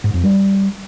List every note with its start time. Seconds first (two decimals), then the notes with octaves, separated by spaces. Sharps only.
0.04 G#2
0.14 F2
0.24 G3